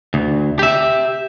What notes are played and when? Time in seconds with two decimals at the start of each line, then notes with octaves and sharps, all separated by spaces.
0.14 D2
0.59 G4 E5